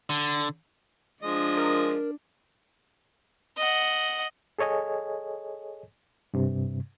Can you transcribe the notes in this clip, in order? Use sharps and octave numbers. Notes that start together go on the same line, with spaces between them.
D3
F3 G#3 D4 D#5
A#4
D#5 F#5
G#4 A4 C#5 D#5 G#5
G2 C3